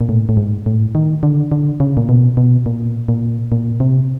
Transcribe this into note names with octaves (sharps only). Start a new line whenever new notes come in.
A#2
A2
A2
G#2
A2
D#3
D3
D3
C#3
A#2
B2
B2
A#2
A#2
A#2
C3